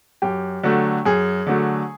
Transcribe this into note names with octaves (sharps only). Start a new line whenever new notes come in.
F#2 G4
D3 F#3 A3
F#2 G#4
D3 F#3 A3